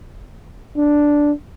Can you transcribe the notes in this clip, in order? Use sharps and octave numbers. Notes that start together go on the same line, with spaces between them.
D4